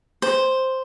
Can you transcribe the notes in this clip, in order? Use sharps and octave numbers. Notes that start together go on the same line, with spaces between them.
C5